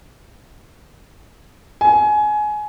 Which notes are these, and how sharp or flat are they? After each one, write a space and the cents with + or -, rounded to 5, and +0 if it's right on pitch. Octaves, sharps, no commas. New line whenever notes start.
G#5 +20